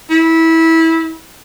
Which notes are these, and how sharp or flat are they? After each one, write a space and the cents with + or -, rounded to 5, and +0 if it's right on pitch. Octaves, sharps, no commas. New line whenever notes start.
E4 -20